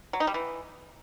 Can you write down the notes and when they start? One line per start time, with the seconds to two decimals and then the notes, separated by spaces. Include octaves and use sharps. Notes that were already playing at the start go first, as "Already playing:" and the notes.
0.13 F#3
0.20 D#4
0.27 G3
0.34 E3